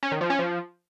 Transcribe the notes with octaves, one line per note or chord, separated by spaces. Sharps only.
C#4
D#3
F3
C#4
F3